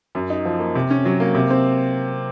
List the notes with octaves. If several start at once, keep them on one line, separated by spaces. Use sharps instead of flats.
F#2
D#4
F3
A#3
C3
C#4
F#3
A#3
C3
C4